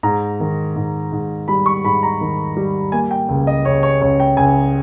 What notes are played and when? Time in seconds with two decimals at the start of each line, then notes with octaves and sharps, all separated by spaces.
0.03 G#2 A#5
0.40 D#3
0.76 G#2
1.12 G#2
1.48 G3 B5
1.66 C#6
1.84 G#2 B5
2.03 A#5
2.21 D#3
2.57 G3
2.92 A#3 G#5
3.11 G5
3.29 C#2
3.47 D#5
3.65 C#2 C#5
3.83 C#5
4.01 C#2 C#5
4.20 G5
4.37 C#2 G#5